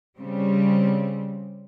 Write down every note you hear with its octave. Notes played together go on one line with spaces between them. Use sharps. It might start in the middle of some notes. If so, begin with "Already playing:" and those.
C#3 G3 C4